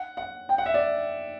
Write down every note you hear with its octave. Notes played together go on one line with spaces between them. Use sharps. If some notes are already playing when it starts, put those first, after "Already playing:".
Already playing: F#5
F#5
G5
F#5
E5
D5